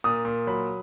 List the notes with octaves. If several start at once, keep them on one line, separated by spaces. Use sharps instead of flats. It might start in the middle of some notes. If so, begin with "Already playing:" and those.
A#2 D#6
A#2
F#3 B5